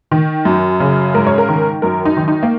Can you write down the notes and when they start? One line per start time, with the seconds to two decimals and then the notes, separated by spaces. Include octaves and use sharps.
0.11 D#3
0.45 F#2
0.80 C#3
1.14 G#2 A#4
1.26 C#5
1.38 A#4
1.48 D#3
1.82 F#2 A#4
2.05 D#4
2.17 D#3
2.28 D#4
2.43 A#3